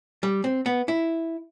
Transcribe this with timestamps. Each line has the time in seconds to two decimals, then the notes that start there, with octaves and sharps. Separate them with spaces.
0.23 G3
0.44 C4
0.66 B3
0.88 E4